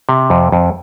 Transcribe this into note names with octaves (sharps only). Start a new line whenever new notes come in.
C3
F2
F2